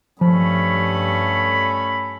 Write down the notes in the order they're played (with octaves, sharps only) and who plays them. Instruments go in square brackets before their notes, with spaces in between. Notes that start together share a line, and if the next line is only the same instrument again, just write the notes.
[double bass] G2 [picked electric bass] F3 [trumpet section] A3 C#4 B5